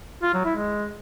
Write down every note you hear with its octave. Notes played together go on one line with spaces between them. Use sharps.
F4
F#3
E4
G#3